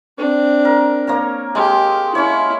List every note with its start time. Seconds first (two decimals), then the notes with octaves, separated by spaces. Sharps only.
0.18 C4 D4
0.65 A#4
1.07 A#3 C#5 A#5
1.55 G#3 G4
2.15 C#4 E4 C#5